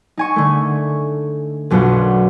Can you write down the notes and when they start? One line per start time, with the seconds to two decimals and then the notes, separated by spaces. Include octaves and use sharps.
0.17 D#4 G#5 C#6
0.36 D3 A3
1.70 B1 F#2 B2 D4 F4 C#7